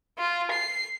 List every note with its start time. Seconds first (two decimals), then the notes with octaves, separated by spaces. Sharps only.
0.19 F4
0.51 C7